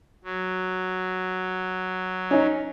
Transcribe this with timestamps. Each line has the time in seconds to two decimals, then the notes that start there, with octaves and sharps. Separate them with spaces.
0.24 F#3
2.31 C#4 D#4